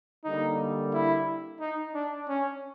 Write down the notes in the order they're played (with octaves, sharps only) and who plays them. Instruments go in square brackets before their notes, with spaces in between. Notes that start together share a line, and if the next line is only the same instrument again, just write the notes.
[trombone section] D3 G3 A#3 [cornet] D#4
[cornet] E4
D#4
D4
C#4